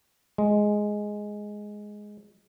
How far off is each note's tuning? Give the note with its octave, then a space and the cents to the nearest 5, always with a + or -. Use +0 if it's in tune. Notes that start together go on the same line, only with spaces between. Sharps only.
G#3 +5